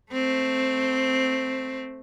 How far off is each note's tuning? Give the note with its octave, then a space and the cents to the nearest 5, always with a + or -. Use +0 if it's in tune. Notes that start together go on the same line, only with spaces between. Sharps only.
A3 +0 C4 +0